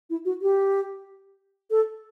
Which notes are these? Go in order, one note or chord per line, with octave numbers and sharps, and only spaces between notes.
E4
F#4
G4
A4